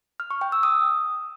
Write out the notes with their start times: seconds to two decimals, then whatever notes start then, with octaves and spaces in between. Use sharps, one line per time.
0.20 F6
0.31 C#6
0.41 G5
0.52 E6
0.63 D#6